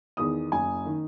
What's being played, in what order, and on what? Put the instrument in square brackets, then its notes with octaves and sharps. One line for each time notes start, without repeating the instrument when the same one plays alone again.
[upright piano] E2 D#3 D#6
F#1 G#5
D#3